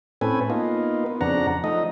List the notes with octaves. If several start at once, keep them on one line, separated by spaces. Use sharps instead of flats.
A2 C4 C#4 A4 B4 G#5
A#3 B3 D#4 F4
B3
F2 C#3 D4 F#5 A#5
F3 A3 D#4 D#5